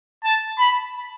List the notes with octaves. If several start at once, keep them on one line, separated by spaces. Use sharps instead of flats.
A5
B5